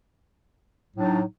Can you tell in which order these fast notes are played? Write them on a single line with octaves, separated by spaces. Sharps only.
A2 F#3 D4 D#4